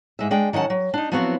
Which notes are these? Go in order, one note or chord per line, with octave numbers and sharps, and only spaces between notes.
G#2 G#3 E5
G#3 D4 G5
D#3 F#3 C#4 F#5 A5
F#3
D4 D#4
F3 F#3 B3 C4 E4 F#4